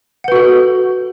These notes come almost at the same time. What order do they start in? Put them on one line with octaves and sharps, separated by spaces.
F#5 B4 F#4 A4